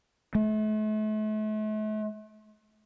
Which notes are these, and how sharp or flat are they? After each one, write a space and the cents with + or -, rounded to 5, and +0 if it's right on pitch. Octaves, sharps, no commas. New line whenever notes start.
A3 -40